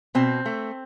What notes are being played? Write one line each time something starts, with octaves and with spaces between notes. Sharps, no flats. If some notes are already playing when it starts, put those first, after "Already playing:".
B2 C4
A3